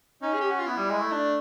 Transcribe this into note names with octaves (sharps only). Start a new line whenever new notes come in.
C#4 D#4
G#4
G4
F#4
F4
B3 E4
G3
G#3
A3
D4